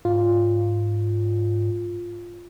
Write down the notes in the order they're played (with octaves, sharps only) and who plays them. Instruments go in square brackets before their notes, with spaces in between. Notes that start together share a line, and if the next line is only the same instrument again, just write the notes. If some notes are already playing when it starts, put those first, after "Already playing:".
[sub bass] G#2 [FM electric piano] F4